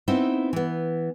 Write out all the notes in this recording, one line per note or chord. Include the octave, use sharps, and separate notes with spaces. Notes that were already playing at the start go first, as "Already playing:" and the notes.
B3 C4 D#4 E4
E3 B3